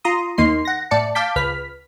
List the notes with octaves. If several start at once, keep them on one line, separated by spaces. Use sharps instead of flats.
F4 A#5 C6 D#6
D#2 A#3 D#4 C6 C7
F#5 A#6
A2 D5 A5 C#7
F5 A5 D6 G6 B6
C#2 B4 F6 B6